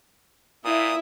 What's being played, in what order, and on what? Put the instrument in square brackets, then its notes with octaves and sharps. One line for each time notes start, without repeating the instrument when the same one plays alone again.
[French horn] A#2 [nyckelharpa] E4 [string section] E5 [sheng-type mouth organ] D#6